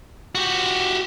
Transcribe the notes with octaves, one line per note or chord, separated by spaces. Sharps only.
F#4 G4